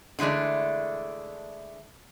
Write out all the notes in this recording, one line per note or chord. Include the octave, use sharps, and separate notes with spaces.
D3 E3 G#3 A3 D4